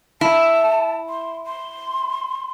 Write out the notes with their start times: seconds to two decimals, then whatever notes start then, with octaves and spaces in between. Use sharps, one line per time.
0.21 E4 A5
1.09 C6
1.46 C6